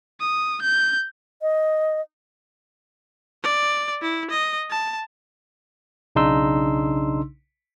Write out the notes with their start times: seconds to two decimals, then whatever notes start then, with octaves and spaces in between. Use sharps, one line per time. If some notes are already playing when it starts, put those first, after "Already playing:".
0.20 D#6
0.62 G6
1.42 D#5
3.43 D5
4.02 E4
4.31 D#5
4.70 A5
6.15 B1 C#3 D4 D#4 C6 E6